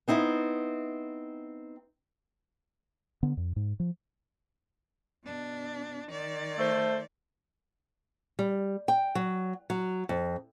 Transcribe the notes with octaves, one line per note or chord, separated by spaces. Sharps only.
B3 C4 D#4 E4
D3 B3
F2
G#2
F3
B2 D4
D#3 D5
A3 C5
G3
G5
F#3
F#3
F2